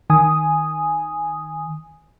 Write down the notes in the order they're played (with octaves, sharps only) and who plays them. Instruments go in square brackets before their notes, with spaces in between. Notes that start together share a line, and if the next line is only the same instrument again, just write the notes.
[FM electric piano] D#3 G#5 D#6